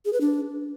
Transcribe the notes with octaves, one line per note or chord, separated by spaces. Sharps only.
G#4
B4
D4